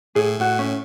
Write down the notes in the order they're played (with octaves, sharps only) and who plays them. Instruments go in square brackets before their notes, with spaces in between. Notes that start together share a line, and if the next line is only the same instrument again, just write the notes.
[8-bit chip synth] A2 [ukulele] G#4
[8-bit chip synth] A2 [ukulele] F#4
[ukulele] C#4